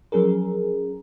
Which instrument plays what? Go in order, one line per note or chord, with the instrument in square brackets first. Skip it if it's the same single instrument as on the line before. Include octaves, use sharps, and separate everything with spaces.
[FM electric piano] F3 F#3 C#4 G#4 A#4